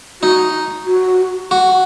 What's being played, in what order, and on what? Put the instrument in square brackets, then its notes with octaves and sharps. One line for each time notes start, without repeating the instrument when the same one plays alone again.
[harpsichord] D#4 [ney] F#4
[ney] F#4
[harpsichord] F#4